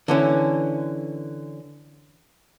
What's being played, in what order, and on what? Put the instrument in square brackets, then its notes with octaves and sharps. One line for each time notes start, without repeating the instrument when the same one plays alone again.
[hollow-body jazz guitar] D3 E3 C#4